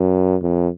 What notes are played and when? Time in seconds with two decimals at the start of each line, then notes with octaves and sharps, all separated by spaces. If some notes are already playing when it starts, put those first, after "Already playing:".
Already playing: F#2
0.42 F2